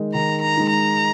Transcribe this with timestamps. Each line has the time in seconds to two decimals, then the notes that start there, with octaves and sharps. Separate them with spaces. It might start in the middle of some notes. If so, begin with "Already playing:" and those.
Already playing: D#3 G#3 D#4
0.14 D#3 A#5
0.42 A#5
0.57 G#3 D#4
0.70 A#5